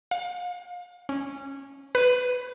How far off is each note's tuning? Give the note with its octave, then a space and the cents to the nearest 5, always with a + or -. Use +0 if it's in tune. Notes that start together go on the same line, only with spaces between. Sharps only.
F5 +30
C#4 -15
B4 +10